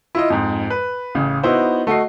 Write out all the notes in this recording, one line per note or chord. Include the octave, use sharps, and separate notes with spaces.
E4 F4 D#5
F2 G#2
B4
A1 C#3
B3 D#4 E4 F#4 C5
A3 F#4 D#5 C7